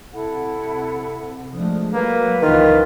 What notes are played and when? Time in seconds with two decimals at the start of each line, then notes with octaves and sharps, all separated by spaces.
0.13 C3 E4 A4 F#5
1.54 F3 G#3 A3 D4 D#6
1.93 F#3 A#3 B4 F#5
2.42 C#2 D#3 E3 F4